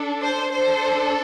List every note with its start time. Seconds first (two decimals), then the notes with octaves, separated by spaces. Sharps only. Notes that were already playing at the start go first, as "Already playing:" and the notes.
Already playing: D4 A4
0.23 C5
0.52 D4 A4 C5